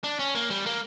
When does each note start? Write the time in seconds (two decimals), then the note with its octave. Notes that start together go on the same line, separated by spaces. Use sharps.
0.04 D4
0.19 C#4
0.35 A#3
0.50 G3
0.66 A#3